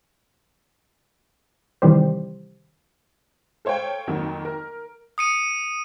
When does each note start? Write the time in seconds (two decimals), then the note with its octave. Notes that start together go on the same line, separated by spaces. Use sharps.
1.82 C3 D#3 E3 G3 G4 C5
3.65 A4 C5 C#5 F5 G5
4.07 F2 D#3 F#3 A#3
4.45 A#4
5.18 D#6 C#7 D#7